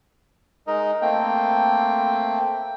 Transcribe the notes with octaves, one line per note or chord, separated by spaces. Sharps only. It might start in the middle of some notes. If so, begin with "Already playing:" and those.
G#3 D#4 A#4 D#5
A3 A#3 C4 G5